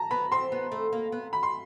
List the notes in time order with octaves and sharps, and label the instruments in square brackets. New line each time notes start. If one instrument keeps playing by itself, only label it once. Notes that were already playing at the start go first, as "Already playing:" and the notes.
Already playing: [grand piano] A5 A#5
[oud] B3 [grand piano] B5
[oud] C4 [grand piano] C6
[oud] B3
A3
A#3
B3
[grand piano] B5
C6